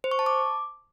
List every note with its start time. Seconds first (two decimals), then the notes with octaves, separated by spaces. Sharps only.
0.04 C5
0.11 C#6
0.19 A5
0.26 D6